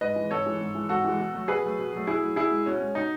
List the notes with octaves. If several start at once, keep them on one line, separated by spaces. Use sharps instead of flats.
G#2 B4 D#5
E3 G#3
G#2 A4 C#5
E3 G#3
G#2
E3 G#3
G#2 F#4 A4
E3 G#3
B2
F#3 A3
B2 G#4 B4
F#3 A3
B2
F#3 A3
B2 E4 G#4
F#3 A3
B2 E4 G#4
G#3
B2 C#4
G#3
B2 D#4